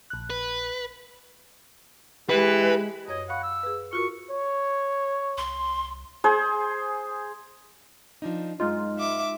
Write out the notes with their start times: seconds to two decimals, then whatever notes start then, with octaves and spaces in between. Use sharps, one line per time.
0.10 A#1 F#6
0.30 B4
2.30 E3 G#3 G4 B4
3.08 F#2 C#5 D#5 G#6
3.29 F5 F#5 B5 C#6
3.43 E6
3.63 G#4 B4
3.93 F4 F#4 A#4 C#6
4.30 C#5
5.38 C2 C6
6.24 G#4 C5
8.22 F3 D4 D#4
8.60 F#2 G#3 D#4 F4 D#5 C6 F6
8.99 E5 D6